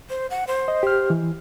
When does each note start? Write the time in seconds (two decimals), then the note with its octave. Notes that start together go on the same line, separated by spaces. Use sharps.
0.10 C5
0.30 F#5
0.47 C5
0.68 D#5
0.83 G4 F6
1.10 E3